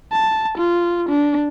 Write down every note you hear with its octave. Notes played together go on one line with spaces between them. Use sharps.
A5
F4
D4